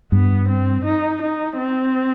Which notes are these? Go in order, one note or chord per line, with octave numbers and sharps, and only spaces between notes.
G2 B3
C4
D#4
D#4
C4